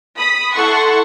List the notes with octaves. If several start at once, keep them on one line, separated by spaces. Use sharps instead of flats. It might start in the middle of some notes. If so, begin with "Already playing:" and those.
B5 D#6 B6
E4 A4 F#5 C6 C#6